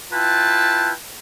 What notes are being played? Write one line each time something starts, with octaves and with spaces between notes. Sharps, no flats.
E4 F4 B4 G5 A5